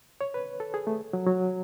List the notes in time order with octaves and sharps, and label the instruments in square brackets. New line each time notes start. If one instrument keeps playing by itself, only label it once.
[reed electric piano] C#5
B4
A4
G#4
A3
F#3
F#3